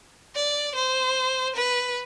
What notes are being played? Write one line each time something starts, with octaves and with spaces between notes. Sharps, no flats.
D5
C5
B4